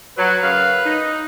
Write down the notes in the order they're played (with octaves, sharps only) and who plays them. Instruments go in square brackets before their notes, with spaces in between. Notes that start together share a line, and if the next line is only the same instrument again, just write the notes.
[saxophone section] F#3 [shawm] B4
[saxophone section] F#2 C#3 F5
D#4